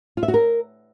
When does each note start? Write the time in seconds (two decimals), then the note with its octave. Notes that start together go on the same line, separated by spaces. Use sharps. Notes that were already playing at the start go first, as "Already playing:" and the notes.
0.17 F4
0.23 E5
0.28 F#4
0.34 A#4